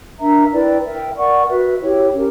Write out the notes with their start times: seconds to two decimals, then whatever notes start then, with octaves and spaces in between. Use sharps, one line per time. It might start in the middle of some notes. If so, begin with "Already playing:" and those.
0.18 D4 A#4 E5 A#5
0.51 E4 B4 D5 G5
0.84 A#4 E5 G5
1.16 A#4 D5 F#5 C#6
1.48 F#4 B4 E5
1.80 E4 G4 C#5 G5
2.13 C#4 G4 A#4